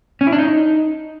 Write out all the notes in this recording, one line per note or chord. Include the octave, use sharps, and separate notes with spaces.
C#4
E4
D4
D#4